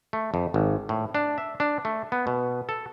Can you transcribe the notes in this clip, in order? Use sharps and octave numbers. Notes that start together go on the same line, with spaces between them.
A3
F2
G#1
A2
D4
E5
D4
A3
B3
B2
A4